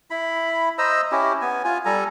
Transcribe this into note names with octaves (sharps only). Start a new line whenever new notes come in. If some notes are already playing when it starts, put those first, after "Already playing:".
E4 B5
C5 D#5 A#5 E6
C#4 E4 G4
B3 G#5
F4 G#5
G3 A4 G#5 A#5